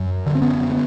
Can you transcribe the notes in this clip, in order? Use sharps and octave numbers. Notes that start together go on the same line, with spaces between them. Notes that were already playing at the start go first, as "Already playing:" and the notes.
Already playing: F#2
D3
C4
B3 C#4
B3